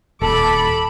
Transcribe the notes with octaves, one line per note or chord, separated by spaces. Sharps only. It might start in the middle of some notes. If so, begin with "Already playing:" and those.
D#1 A4 A5 B5 D6